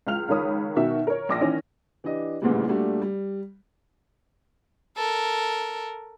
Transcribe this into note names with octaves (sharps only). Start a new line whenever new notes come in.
C#2 F4 F6 F7
C#2 D#3 A#4 C#5 B5 D#6
B2 D#3 F#4 E5
A#4 C#5
A#1 D6 A#6
D#3 E3 C#4
E3 D4 G4 D#5
A1 D2 A#2 C#3 E3 G3
A#2 G3 A3 D4 F#4 G4
G3
A4 A#4